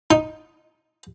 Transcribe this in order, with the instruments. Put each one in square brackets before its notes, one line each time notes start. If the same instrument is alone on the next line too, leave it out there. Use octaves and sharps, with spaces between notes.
[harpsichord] D#4